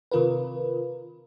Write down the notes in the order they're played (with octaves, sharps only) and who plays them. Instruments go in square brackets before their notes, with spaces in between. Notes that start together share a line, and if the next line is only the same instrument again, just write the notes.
[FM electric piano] C3 D#3 F4 A#4 B4